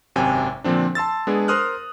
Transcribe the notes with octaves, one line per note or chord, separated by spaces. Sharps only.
G#1 F#2 C3 G5 G#5
A#2 D3 F3 C4 D4
A5 C6 E6 A6
G#3 B3 D4 G#4
A#4 C5 C6 D#6 F6 F#6